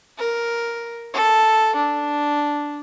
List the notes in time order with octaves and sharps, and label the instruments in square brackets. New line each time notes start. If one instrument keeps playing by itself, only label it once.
[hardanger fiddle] A#4
A4
D4